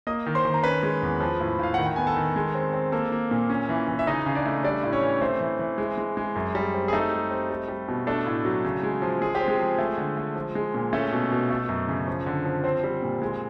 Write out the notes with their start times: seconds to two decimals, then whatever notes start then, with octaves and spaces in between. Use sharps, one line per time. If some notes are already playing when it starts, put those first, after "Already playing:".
0.07 A#3 D#5 D#6
0.26 D#3
0.35 C5 C6
0.45 D#3
0.54 A#5
0.63 C#4 B4 B5
0.83 G#3
1.02 E2
1.20 F3
1.40 A2
1.59 A2 F5
1.74 D#3 F#5
1.86 G5
1.96 B3 G#5
2.07 A4 A5
2.17 D#3
2.36 G#3
2.55 C4
2.73 C4
2.92 A#3 A4 A5
3.12 A#3
3.31 A#2
3.50 C#4
3.69 E3
3.88 E3
3.99 E5
4.07 C#3 D#4 D#5
4.26 C#3
4.35 D4 D5
4.46 A3
4.64 G3 D4 D5
4.83 A2 D5
4.92 C#4 C#5
5.02 E3
5.21 A3 C4 C5
5.41 E3
5.59 E3
5.78 G#3
5.98 G#3
6.17 G#3
6.36 F#2
6.55 G3
6.74 C4
6.88 G#4
6.93 A3 D#4 A4
7.11 G3
7.31 C4
7.50 G3
7.68 G3
7.88 B2
8.07 A3 D4 A4
8.26 A2
8.45 F#3
8.64 C#3
8.83 G#3
9.02 F3
9.22 G#3 G#4
9.35 G4
9.40 C4
9.48 G#3 G#4
9.59 F3
9.79 A3
9.97 D3
10.17 A3
10.35 F3
10.55 G#3
10.74 A#2
10.93 A3 C#4 A4
11.12 B2
11.32 B2
11.50 A3
11.69 F#2
11.88 C#3
12.07 F3
12.26 D3
12.45 F3
12.64 C4 C5
12.84 G3
13.02 A#2
13.22 G#3